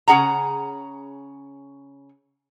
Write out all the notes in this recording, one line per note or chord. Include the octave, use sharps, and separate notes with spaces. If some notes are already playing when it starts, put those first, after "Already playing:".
C#3 C#4 G#4 F#5 A#5